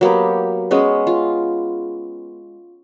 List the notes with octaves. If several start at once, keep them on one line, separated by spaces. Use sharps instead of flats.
F#3 A#3 B3 G4
G#3 B3 C#4 G#4
F4